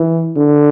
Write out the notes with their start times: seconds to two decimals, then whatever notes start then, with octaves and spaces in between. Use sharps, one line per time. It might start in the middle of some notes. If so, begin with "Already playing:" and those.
Already playing: E3
0.36 D3